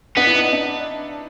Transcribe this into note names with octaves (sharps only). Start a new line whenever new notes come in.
B3 D4
E4
D#4
D4